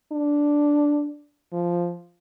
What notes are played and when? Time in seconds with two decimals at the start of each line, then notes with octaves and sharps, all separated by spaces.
0.12 D4
1.53 F3